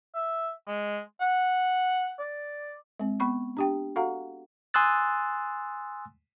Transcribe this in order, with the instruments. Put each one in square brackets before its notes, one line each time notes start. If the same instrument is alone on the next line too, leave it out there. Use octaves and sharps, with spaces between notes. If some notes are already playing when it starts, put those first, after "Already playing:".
[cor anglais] E5
G#3
F#5
D5
[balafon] G#3 C4
B3 B5 C#6
D4 G4 G5
F#4 A4 F5 F#5 A#5
[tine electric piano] G#5 C6 D#6 E6 F#6 A6